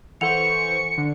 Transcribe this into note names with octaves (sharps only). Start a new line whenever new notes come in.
E3 A4 C5 F#5 C#6 C#7 F7
D3